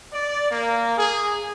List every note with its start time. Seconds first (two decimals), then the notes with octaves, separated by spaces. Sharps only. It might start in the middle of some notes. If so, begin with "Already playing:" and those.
0.14 D5
0.51 A#3
0.97 G#4